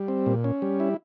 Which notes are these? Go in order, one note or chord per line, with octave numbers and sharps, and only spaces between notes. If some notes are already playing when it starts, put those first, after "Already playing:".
Already playing: G3
C4
A#2
C#4
G3
E4